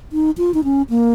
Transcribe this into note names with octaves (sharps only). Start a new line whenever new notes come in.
D#4
F4
D#4
C#4
A#3